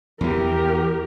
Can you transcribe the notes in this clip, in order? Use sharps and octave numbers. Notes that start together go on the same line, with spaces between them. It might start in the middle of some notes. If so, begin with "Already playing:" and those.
E2 E3 G4 A#4